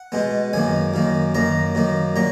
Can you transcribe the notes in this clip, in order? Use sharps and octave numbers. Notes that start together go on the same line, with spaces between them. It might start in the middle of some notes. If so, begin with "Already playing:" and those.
Already playing: F#5
B2 G#3 B3
F#2 D#3 A#3 G#5
F#2 D#3 A#3
F#2 D#3 A#3 A#5
F#2 D#3 A#3
A#2 F#3 A#5